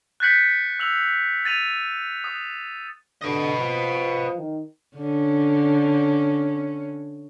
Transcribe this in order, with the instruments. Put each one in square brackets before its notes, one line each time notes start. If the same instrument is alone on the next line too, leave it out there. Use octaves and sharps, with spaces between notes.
[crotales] F#6 G6 A6 B6 C#7 F#7
E6 F7 F#7
A6 D#7 F7
D#6
[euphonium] D3 [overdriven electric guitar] B4 D#5
[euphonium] F3
D#3
[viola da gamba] D3 C#4